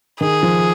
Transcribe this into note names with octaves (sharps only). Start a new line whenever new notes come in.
D#3 G#4
F3